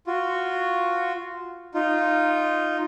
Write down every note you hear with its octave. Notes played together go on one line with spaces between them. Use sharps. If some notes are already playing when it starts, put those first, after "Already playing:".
F4 F#4
D#4 F4